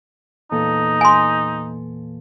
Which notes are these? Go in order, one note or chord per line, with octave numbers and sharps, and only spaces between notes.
E2 A#2 D#4 A4
G#5 C6